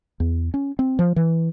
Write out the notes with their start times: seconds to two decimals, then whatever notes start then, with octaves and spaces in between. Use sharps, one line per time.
0.20 E2
0.54 C#4
0.79 C4
0.99 F3
1.16 E3